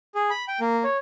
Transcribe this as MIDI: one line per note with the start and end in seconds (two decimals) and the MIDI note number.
0.15 0.30 68
0.30 0.45 83
0.48 0.59 79
0.61 0.84 58
0.84 0.97 73